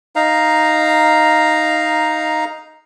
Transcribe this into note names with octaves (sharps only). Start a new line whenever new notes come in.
D#4 F5 A#5